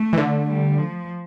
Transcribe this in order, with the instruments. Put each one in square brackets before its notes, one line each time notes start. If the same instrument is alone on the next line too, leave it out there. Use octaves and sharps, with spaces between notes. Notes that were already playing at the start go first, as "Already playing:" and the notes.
Already playing: [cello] A3
[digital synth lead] E3
D3
[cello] G3
F3